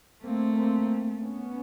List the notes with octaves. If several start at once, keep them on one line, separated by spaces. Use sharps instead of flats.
A3 A#3 C4
A#3 C4
B3 C#4